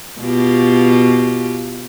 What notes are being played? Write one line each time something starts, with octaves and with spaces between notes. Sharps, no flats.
B2 F4 G4